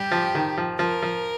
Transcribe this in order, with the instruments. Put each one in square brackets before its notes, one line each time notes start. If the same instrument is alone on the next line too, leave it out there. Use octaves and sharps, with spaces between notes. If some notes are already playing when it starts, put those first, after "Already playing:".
Already playing: [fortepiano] G3 [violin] G4
[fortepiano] F3
D#3
F3
[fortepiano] F3 [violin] A#4
[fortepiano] F3